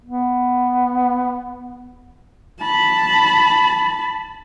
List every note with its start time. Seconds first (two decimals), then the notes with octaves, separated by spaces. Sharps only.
0.04 B3
2.61 A5 B5